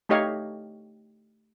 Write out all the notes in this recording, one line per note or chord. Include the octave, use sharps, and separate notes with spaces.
A3 D#4 G4 C#5 D#5 F5